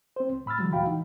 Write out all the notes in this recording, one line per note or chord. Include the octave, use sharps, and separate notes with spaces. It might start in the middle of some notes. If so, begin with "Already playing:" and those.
C4 C5
C#2
A2 B5 E6 F6 A6
D3 E3 F#3 G#3
D#2 A#2 F#4 F5 G5 B5
E3 D#4